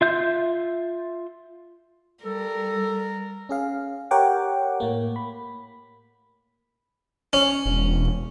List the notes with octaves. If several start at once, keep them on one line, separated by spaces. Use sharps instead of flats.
F4 E5 G6
G3 A4 A#4
C#4 G#4 F5
G4 A#4 C#5 F#5 G5 D6
A2 A#3
B5
C#4
E1